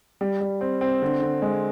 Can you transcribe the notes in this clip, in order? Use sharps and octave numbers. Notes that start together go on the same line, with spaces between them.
G3
G3
C4
C4
D3
D3
G#3